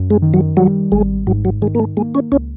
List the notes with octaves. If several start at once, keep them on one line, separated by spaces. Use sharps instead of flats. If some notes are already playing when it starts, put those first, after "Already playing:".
Already playing: F#2
G#3
D#3
F#3
F#3 G3
G#1 G#3
G#2 F#3
F#3
D#3 G#3
A#3
A3
G#3 A#3
C#4
C#2 C#4